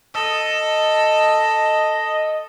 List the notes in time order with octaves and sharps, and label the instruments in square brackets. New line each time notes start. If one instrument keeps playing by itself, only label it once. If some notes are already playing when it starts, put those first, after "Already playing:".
[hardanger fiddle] A4 [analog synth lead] D#5